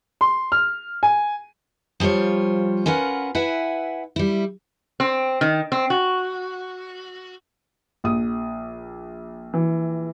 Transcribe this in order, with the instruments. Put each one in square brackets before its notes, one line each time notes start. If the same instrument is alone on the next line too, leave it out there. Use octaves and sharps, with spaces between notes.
[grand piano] C6
F6
G#5
[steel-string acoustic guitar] F3 G3 F4 C5 C#5
C#4 F4 A#4 B4 F#5
E4 B4 E5 F#5 G#5
G3 E4
[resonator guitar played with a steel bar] C4
D#3
C4
F#4
[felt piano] A#1 D#6
[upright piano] E3